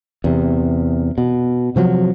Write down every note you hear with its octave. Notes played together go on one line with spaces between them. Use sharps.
E2 C3
B2
C3 F3 F#3